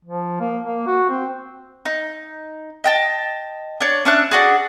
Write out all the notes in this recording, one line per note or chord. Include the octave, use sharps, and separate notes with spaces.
F3
A#3
A#3
F#4
C4
D#4
D#5 G5 A5
D4 C#5
C#4 D4 E5 F#6
D4 F#4 G#4